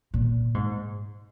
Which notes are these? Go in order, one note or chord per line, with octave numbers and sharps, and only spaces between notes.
A#2
G#2